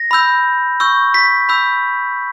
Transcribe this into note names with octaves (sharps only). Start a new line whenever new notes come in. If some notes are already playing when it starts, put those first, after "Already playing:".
Already playing: A#6
B5 E6 G6
C#6 E6 G6
B6
B5 E6 G6